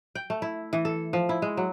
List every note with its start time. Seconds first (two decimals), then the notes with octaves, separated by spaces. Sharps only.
0.15 G5
0.30 A3
0.42 E4
0.73 E3
0.85 A4
1.13 F3
1.29 E4
1.42 G#3
1.57 F#3